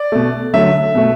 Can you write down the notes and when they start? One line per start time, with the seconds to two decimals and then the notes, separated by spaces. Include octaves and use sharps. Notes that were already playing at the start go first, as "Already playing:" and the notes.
Already playing: D5
0.12 B2 A3
0.54 D3 F#3 A3 E5
0.95 B2 A3